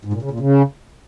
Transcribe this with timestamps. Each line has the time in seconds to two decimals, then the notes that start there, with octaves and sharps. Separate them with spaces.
0.05 G#2
0.13 A#2
0.22 C#3
0.31 A#2
0.40 C#3